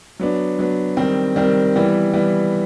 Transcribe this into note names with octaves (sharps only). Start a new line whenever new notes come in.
F#3 B3 D4
F#3 B3 D4
D#3 G3 C4
D#3 G3 C4
E3 G3 B3
E3 G3 B3